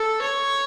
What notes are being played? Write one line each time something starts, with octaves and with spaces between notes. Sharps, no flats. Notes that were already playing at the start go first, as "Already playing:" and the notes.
Already playing: A4
C#5